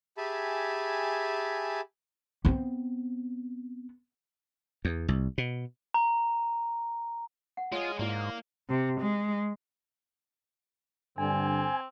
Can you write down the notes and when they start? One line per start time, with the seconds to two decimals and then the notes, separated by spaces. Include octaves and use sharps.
0.17 G4 G#4 E5 G#5 A5 B5
2.45 B3 C4
4.85 E2
5.08 C2
5.38 B2
5.94 A#5
7.57 F#5
7.72 G#3 F4 C#5 D#5
7.99 G#2 A#3 E4 D5 C6
8.69 C3
9.01 G#3
11.18 G2 D3 C4 G#5